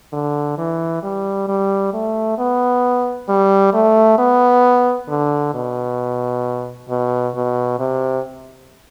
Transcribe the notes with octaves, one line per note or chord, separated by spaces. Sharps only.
D3
E3
G3
G3
A3
B3
G3
A3
B3
D3
B2
B2
B2
C3